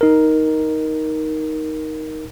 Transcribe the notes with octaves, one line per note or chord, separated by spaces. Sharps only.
D#4 A#4